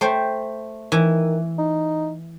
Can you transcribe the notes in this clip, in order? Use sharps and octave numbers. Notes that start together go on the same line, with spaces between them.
A3 C5 G5
D#3 E3
D#4